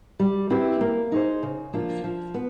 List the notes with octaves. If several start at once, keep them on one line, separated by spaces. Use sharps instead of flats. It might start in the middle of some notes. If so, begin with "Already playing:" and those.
G3
C4 E4 G4 B4
A#3
D#4 G#4 C5
C#3
F3 A#3 D4 F4
F3
B3